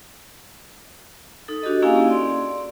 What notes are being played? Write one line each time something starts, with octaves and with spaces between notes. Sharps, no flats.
D#4 A4
D4 F#4 G4 A4 D#5
A#3 C#4 E4 G#4 F5 G#5
D5 C6